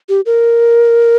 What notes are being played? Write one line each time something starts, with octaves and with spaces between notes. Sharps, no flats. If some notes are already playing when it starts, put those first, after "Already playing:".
G4
A#4